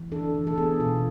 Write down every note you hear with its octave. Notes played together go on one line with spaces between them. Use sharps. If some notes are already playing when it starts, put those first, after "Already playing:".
Already playing: E3
D4 A4
E3
A4
B3 G#4
B2 F4